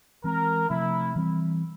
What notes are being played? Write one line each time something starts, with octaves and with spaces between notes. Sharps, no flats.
E3 G#3 C4 A#4
C3 F3 A3 C4 E4
E3 G3 C4